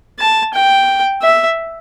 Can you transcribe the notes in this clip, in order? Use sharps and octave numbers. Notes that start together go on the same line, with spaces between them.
A5
G5
E5